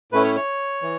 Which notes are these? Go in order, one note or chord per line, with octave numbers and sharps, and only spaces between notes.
A2 A3 C#4 E4 B4
C#5
C#5
E3